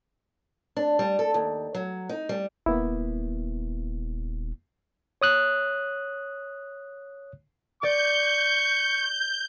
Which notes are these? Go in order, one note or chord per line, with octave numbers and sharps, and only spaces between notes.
D4
G3
A4
D#2
F#3
D#4
G3
D#1 A#3 B3 E4
C#5 D#6 F#6
D5 C#6 G6